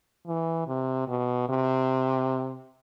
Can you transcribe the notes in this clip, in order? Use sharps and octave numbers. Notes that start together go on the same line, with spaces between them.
E3
C3
B2
C3